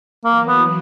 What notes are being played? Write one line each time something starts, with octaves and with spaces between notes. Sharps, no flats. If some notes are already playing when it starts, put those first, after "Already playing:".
E3 F#3 A#3
B3